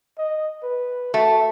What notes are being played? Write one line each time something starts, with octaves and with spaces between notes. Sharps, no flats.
D#5
B4
A3 F#4